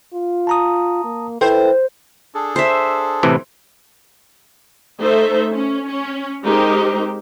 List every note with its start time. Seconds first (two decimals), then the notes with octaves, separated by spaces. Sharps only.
0.14 F4
0.47 A5 A#5 D#6
1.04 A#3
1.41 E4 A4 B4 C5 G5
2.35 D4 G#4 A4
2.56 C5 E5
3.23 A2 C3 E3
5.00 A3 D#4 A4 C5 E5
5.51 C#4
5.88 C#4
6.42 G#3 C4 D#4 G4 A#4 C5